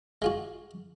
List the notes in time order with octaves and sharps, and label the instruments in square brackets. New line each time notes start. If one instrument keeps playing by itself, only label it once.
[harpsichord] G#3 F4 F#4